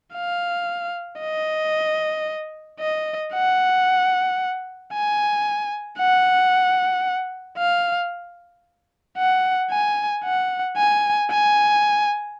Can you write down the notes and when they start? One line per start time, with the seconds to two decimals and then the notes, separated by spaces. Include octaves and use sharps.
0.15 F5
1.20 D#5
2.80 D#5
3.34 F#5
4.93 G#5
5.99 F#5
7.58 F5
9.18 F#5
9.70 G#5
10.25 F#5
10.77 G#5
11.31 G#5